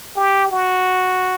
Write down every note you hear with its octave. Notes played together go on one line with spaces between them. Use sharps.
G4
F#4